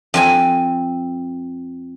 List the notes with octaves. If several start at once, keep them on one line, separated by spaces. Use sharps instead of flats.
F2 C4 G#5